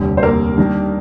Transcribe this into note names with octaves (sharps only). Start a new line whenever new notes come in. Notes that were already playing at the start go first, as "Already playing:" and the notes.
Already playing: F1 D#2 D3 G3
C5
A#3 A#4
D#3 G3 D4 G4